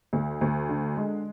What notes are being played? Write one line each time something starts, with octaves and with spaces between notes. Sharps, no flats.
D2
D2
D3
G#3